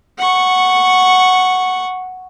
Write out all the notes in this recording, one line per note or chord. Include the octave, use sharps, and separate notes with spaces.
F#5 C#6